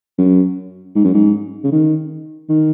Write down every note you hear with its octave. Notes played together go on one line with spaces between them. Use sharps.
F#2
G#2
F#2
G#2
C#3
D#3
D#3